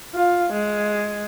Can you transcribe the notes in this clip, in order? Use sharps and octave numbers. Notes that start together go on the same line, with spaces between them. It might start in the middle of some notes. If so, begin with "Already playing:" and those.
F4
G#3